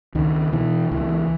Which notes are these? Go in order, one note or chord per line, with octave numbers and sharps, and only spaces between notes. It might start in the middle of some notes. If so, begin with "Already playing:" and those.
C#2 D#3
B2 E3
C#2 E3